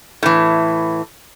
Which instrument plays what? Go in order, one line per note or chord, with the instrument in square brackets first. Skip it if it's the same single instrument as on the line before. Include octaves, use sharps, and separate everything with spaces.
[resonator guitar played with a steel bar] A2 E3